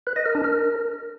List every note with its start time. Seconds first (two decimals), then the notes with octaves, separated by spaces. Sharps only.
0.07 B4
0.16 D#5
0.26 A#4
0.35 D4
0.44 A#4